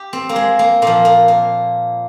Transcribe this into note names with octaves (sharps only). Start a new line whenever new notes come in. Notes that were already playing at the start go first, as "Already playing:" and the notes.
Already playing: G4
C4
A#3
G#3
A#3
A#2 F3 A#3
A#3
A#3